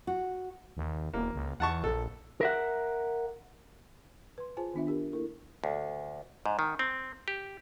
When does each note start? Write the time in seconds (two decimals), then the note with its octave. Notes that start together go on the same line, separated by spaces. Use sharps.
0.07 F#4
0.77 D#2
1.14 E1 A#3
1.35 C#2
1.60 E2 F#5 A5 C#6
1.84 A#1 A4
2.41 A#4 E5 F#5
4.38 B4 C6
4.57 F4 G#4 C5 G#5 A5
4.74 D#3 B3 D4 F4 E5
4.87 D4 G4 A#4
5.13 A#3 E4 A4 A#4
5.64 D2
6.46 G#2
6.59 D#3
6.79 C4
7.28 G4